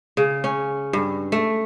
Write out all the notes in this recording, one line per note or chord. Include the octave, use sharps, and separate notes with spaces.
C#3
C#4
G2
A3